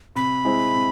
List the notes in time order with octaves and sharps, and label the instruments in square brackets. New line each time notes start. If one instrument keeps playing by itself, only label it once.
[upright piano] C3 [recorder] B5
[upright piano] G#3 C4 E4
C3